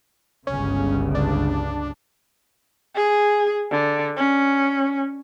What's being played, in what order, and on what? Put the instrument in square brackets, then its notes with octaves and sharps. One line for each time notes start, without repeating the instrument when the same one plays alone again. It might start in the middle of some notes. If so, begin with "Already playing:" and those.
[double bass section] G1 C#2 C#3 [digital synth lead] C#4
[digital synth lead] D4
[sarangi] G#4
D3
C#4